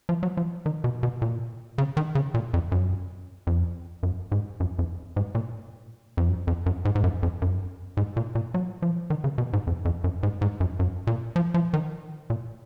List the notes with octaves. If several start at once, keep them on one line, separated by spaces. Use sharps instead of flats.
F3
F#3
F3
D#3
B2
B2
A#2
C#3
D#3
C#3
A#2
F2
F#2
F2
F#2
G#2
F#2
F2
G#2
A#2
F2
F#2
F2
F#2
G#2
G#2
F#2
F2
F#2
G#2
A#2
A#2
F#3
F3
D#3
C#3
B2
G#2
F2
F2
F#2
G#2
G#2
F#2
F#2
A#2
F3
F3
D#3
A#2